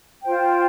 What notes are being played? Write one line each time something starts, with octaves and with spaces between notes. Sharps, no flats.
F4 C5 G5